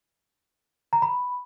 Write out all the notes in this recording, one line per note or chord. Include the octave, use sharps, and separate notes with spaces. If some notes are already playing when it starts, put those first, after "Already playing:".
A#5
B5